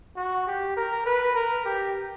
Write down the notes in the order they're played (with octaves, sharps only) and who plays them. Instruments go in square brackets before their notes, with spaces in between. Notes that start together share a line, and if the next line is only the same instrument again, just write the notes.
[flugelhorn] F#4
G4
A#4
B4
A#4
G4